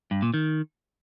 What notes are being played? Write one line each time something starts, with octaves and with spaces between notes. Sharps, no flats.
G2
A#2
D#3